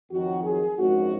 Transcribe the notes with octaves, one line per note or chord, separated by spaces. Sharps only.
F2 D#3 F#3 F#4
G#4
G#1 F#2 F3 F#4